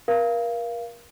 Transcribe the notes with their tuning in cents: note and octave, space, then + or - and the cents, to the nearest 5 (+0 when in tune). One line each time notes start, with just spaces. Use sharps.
A#4 +30 F5 -20